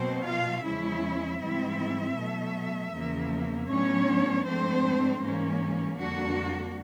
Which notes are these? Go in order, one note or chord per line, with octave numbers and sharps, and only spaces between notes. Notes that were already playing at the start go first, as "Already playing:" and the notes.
Already playing: B2 F#3 A#3 C4 C5
F4 F5
E2 C#3 F3 G#3 C#4 E4 E5
G#2 E3 G3 C4 E4
B2 F#3 A3
E2 C#3 F3 A#3
A2 F#3 B3 C#4 D4 C#5
G#2 F3 A3 C4 D4 C5
G#2 E3 G3 A#3 C#4
F2 D3 G3 A#3 D4 F#4